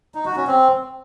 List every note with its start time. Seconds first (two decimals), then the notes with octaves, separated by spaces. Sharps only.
0.15 D#4
0.26 F#4
0.36 C#4
0.47 C4